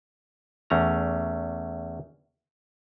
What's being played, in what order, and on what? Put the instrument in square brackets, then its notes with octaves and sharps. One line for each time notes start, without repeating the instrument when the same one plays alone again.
[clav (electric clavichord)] E2 A3 C#4 A#5